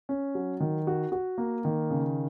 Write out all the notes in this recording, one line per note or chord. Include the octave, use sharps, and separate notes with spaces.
C#4
F#3
D#3
F#4
F#4
A#3
D#3
C#3